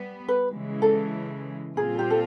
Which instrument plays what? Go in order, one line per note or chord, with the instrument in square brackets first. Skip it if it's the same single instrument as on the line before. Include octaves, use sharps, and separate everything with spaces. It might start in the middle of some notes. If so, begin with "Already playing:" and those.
Already playing: [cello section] G3 B3
[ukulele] B4
[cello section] C#3 E3 G#3
[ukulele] A4
[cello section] A#2 G3 C4 F4 [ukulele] G#4
[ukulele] G4
A4